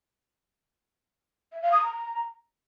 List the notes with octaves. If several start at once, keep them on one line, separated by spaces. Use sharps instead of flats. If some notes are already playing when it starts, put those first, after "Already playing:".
E5
F5
D#6
A#5